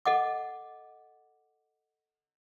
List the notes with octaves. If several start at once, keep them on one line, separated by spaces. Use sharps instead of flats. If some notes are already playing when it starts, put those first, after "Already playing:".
A4 D#5 F#5 D6